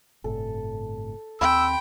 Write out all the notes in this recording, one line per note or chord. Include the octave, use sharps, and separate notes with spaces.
G1 A2 C3 A4
D#2 B3 C4 G5 B5 C6 D6 E6